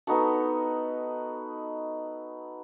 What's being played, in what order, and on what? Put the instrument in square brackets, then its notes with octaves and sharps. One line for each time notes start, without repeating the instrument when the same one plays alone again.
[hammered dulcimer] B3 D#4 F#4 A4